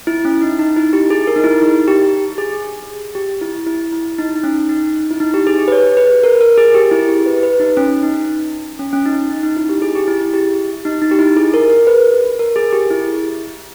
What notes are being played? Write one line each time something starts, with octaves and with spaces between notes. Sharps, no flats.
E4
C#4
D#4
D#4
E4
G4
G#4
A#4
D#4
E4
D#4
G4
G#4
G4
E4
E4
E4
D#4
D#4
C#4
D#4
E4
D#4
G4
G#4
G4
B4
C#5
B4
A#4
A#4
G#4
G4
E4
G4
B4
B4
D#4
C#4
D#4
C#4
C#4
D#4
D#4
D#4
E4
G4
G#4
G4
E4
E4
G4
D#4
D#4
G4
E4
G#4
A#4
A#4
B4
A#4
G#4
G4
E4